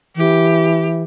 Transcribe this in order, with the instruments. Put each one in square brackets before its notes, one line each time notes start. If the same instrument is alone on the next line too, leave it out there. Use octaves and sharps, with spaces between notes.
[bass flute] E3 [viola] G4